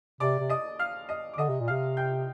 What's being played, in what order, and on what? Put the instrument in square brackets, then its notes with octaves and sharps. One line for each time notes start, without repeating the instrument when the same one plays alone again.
[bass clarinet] C3 [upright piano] D5 D6
[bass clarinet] C3
[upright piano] D#5 D#6
F5 F6
D#5 D#6
D6
[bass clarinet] D3 [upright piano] D#5 D#6
[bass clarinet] C3
A#2
[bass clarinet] C3 [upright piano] F5 F6
[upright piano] G5 G6